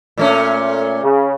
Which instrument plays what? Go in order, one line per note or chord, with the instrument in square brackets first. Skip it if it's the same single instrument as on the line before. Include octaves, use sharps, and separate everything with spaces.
[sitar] A#2 A3 C#4
[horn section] C#3